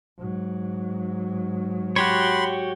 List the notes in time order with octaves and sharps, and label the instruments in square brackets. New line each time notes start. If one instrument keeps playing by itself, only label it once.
[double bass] G#2 F#3
[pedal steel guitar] F#4 G4 C#5 [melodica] B5 C6